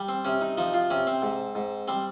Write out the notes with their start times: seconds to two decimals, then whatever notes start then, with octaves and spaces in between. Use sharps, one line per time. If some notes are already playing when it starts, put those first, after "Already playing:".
Already playing: G3
0.09 C4
0.25 C3 C#4
0.41 D#4
0.57 F3 D#4
0.74 F4
0.90 C3 C#4
1.07 C4
1.22 G#2
1.55 G#2
1.88 G3 C4